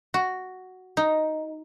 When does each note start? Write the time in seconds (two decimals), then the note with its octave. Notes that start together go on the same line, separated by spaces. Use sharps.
0.14 F#4
0.97 D#4